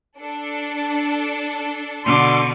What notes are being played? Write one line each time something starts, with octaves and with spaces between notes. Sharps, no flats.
D4 A4
B2 D3 C6 D6